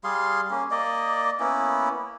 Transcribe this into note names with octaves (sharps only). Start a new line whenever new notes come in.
G3 G#4 F5 C6
A#3 C#4
A#3 D5 D#5
A#3 B3 C#4 E4